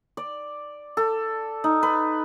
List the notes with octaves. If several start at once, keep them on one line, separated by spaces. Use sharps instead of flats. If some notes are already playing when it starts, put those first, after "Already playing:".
D5
A4
D#4
B4